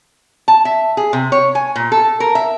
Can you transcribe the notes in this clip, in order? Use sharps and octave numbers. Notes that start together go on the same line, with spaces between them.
A5
E5
G#4
C3
C#5
G#5
A#2
A4
A#4
E5